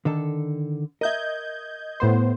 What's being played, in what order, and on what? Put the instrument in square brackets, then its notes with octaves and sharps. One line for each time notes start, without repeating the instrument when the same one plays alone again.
[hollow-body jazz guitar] D3 D#3 A4
[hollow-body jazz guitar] A#4 E5 [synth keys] D#5 G6 G#6
[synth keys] A2 B3 C5